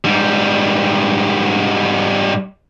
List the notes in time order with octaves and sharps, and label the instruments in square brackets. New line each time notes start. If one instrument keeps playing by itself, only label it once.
[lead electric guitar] G#2 G3